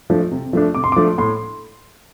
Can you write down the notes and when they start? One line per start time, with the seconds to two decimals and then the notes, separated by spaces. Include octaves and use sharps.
0.10 F3 A3 D4
0.32 C3
0.53 F3 A3 D4
0.75 C3 D6
0.84 C6
0.92 D6
0.96 F3 A3 D4
1.18 A2 C6